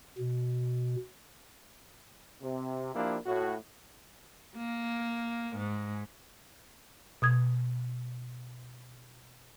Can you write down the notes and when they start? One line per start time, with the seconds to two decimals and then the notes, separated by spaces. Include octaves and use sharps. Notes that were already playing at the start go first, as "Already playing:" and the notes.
0.18 B2
2.42 C3
2.95 F3 A#3 D4 E4 G4
3.26 A2 F#4
4.56 A#3
5.56 G#2
7.22 B2 D#6 G#6